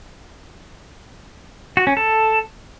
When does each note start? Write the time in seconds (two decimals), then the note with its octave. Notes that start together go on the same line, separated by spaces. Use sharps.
1.77 F#4
1.87 C#4
1.97 A4